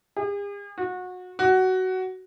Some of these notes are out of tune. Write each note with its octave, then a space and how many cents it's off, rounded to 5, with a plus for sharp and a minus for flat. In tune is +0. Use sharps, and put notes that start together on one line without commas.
G#4 -45
F#4 -25
F#4 +15